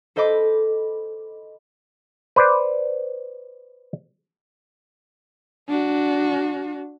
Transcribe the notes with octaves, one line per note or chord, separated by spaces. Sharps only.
A4 C5 D#5 B5 D6
B4 C5 D5
D4 F#4